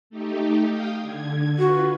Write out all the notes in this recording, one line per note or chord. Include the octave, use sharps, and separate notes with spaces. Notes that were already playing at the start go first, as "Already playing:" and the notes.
A3 D#4 G4
F5 G5 D#6
D3 G#6
F4 F#4 B4